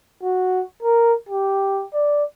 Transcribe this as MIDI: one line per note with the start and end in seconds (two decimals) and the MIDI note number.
0.23 0.62 66
0.83 1.13 70
1.29 1.85 67
1.94 2.24 74